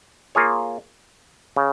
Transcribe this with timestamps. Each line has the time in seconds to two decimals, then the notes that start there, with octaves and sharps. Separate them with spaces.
0.35 A#3 F4 G#4 C#5
1.56 C#3